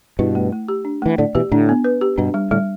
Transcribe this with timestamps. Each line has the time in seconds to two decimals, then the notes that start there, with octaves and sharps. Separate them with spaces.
0.19 G2 B2 E4
0.35 A3
0.52 A3
0.68 G4
0.85 D4
1.02 E3 A3
1.18 A2 D3 D5
1.35 B2 E3 G4
1.52 A2 D3 D4
1.69 B3
1.84 B4
2.01 G4
2.18 G2 B2 D4
2.34 G3
2.51 A2 D3 G3